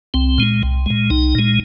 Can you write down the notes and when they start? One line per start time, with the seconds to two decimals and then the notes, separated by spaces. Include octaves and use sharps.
0.14 C2 C4
0.38 A#2 G#3
0.63 C2
0.86 A#2 G#3
1.10 C2 D#4
1.35 A#2 G#3